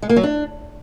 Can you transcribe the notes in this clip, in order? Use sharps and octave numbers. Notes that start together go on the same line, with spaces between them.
G#3
A#3
F#3
D4